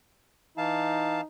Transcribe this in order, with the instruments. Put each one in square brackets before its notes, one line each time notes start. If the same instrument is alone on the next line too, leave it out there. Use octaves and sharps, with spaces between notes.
[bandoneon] E3 F5 A5 [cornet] D#4